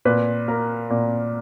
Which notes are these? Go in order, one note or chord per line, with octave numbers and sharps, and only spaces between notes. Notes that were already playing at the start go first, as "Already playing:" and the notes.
A#2 B4
A#3 A#4
A#2